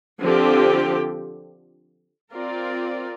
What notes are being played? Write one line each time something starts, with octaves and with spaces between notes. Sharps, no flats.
D3 F3 C4 G4
C4 F4 A#4 D5